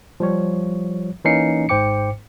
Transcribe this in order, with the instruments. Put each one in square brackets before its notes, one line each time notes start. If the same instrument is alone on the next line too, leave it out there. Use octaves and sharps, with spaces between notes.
[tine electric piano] F3 G3 C#5
E3 A#3 C#4 D#4 C7 C#7
G#1 G#2 C5 G5 D6 C#7